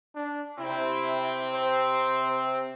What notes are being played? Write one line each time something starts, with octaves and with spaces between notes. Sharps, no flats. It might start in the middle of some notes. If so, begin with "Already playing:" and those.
D4
C3 C4 E4
C5